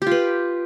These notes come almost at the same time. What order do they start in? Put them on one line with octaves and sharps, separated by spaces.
G4 F4 B4